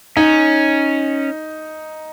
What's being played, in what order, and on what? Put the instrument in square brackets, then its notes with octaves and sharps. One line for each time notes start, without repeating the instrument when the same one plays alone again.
[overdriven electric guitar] C#4 [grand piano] D#4